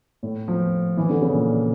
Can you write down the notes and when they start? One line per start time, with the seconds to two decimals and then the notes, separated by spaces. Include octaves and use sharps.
0.23 A2
0.48 F3
0.97 E3
1.09 D3
1.22 C#3
1.33 A#2